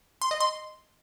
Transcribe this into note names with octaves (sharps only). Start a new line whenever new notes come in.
C6
D#5
C6